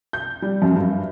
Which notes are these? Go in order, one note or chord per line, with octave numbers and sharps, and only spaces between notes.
G6
G3
F#2
G2